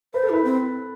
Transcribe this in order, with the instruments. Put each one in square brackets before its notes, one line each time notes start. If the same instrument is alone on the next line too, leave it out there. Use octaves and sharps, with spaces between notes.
[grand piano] B4 [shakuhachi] C5
[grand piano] A4
[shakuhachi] E4 [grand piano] B4
[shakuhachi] C4